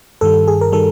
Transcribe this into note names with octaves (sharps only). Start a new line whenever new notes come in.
G2 D#3 G3 A4
G#4
A#4
D#3 G3 A4